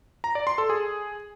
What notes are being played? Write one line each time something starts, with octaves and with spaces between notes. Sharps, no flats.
A#5
D5
C6
A4
G#4